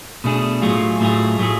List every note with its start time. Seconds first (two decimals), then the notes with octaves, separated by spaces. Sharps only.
0.24 B2 A3 D4 G#4
0.62 A2 F#3 A3 F4 G#4
1.00 A2 F#3 A3 F4 G#4
1.39 A2 F#3 A3 F4 G#4